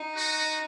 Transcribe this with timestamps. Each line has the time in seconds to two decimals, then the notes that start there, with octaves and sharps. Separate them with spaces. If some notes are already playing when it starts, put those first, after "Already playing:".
Already playing: D#4
0.16 F#4